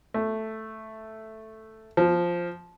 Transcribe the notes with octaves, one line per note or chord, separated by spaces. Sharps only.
A3
F3